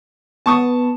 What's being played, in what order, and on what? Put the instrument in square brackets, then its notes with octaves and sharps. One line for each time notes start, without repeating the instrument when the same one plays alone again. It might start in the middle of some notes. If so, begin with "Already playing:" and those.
[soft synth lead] B3 [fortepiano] A5 C#6 D#6